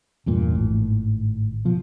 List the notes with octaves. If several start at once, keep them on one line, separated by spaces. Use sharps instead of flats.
E2 G2 A#2
G#1 A2
B2 F3